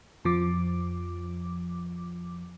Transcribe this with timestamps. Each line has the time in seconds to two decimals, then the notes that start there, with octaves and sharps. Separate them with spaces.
0.25 F2 F3 D6